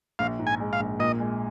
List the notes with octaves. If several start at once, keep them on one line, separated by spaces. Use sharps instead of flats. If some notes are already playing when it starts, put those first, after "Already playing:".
A#1 F5
G#2
G#5
G#3
F5
A#1
A#2 D#5
G#3